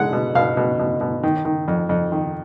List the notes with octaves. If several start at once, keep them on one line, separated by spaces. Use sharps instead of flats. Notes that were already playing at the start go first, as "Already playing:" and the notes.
Already playing: B2 G#3 F#5
B2
B2 F5
B2
B2
B2
D#3
D#3
F2
F2
D#3